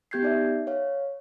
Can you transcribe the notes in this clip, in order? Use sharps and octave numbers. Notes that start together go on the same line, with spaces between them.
B3 G4 G6 G#6 C7
D#4 D5 E5
C#5 F5